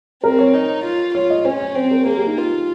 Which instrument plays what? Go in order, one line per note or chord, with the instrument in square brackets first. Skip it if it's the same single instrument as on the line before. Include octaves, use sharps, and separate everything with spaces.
[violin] C4 [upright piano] A#4
[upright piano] C#5
[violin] D#4
F4
[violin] F4 [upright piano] C#5
[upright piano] D#5
[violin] C#4 [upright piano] C5
[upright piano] C#5
[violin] C4 [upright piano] C5
[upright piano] A#4
[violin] A#3 [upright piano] G#4
[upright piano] G4
D#4
[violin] F4